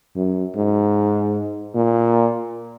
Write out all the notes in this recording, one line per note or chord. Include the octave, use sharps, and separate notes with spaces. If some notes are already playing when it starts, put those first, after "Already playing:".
F#2
G#2
A#2